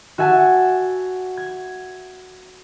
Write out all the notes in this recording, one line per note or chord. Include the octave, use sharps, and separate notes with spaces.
F#4 E5 F#5 G#5 A5
G#6